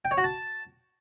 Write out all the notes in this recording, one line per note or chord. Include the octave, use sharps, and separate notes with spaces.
G5
C#5
F#4
A5